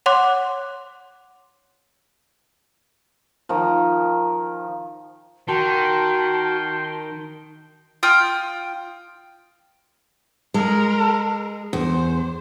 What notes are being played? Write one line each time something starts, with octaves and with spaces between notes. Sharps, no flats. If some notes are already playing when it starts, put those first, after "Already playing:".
C#5 F#5 C6 D6 F#6
D#3 F3
D#3 F#4 G5 A5 C6
F4 G5 D#6 F6
G#3 A#4
E2 C5